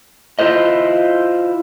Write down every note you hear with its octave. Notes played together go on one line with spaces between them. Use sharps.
E4 F4 G4 G#4 C5 D#5